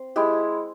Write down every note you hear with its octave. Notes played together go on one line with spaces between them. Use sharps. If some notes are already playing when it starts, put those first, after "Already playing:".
Already playing: C4 C5
G#3 E4 G4